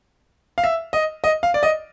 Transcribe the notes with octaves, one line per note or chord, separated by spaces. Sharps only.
F5
E5
D#5
D#5
F5
D5
D#5